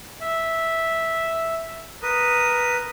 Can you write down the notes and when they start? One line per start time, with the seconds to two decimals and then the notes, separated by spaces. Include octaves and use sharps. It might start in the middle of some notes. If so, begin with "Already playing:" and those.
0.21 E5
2.02 A#4 B4 D#6